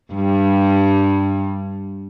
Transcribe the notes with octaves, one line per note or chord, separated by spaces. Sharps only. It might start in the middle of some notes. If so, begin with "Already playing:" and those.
G2 G3